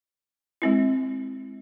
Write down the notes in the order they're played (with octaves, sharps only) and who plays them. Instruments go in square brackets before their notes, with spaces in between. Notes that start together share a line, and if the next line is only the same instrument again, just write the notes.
[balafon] G#3 C4 E4